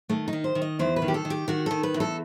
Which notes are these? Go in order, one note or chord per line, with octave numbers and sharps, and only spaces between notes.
D#3 A3
D#4
D#3
C5
D#3
D#5
E2 C5
B4
D#3
G4
A4
D#3
G4
D#3 F#4
D#3 A4
B4
E2
A4